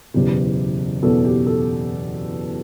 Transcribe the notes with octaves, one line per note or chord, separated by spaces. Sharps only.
F#1 E2 B2 G4
F#1 E2 B2 A4
G4
A4